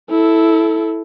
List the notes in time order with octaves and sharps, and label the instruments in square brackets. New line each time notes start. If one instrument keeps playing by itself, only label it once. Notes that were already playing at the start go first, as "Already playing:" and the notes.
[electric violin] E4 A4